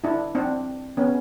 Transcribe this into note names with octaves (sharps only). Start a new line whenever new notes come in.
D4 E4
C4 D4
B3 C#4